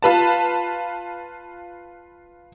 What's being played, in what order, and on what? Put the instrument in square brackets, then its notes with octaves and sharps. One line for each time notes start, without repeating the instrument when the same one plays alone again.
[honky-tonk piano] F4 B4 A5